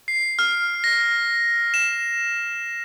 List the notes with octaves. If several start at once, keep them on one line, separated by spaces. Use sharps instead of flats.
C7
F6
A#6
E7